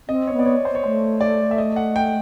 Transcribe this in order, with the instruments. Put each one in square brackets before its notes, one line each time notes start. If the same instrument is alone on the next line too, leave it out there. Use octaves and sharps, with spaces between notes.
[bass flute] C4 [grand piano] D#5
[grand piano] C#5
[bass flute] B3
[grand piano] D5
C#5
C5
C#5
[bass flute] A3 [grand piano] C5
[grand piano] D5
E5
D#5
F#5
G5